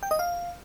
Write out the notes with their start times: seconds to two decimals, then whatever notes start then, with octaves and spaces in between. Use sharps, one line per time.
0.03 G5
0.11 D#5
0.19 F5